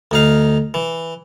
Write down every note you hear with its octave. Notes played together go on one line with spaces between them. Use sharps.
D2 D#4 F5
E3